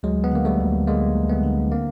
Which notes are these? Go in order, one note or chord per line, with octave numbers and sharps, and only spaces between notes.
D2 F#3 G#3
B3
D3 A#3
G3 A3
D2
D3 G#3 A#3
D2
A3 B3
D3
A#3 C4